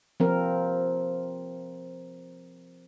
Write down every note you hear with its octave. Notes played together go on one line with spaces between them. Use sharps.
F3 C4 A#4